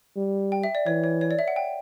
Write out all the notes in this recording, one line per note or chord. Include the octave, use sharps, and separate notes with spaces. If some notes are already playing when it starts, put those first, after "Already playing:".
G3
G5
E5
D5
E3 C#5
C#5
C#5
D5
E5
F#5
G5